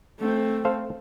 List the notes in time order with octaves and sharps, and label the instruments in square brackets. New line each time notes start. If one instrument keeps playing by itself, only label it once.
[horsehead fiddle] A3 C4
[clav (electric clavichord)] A4 C5 F5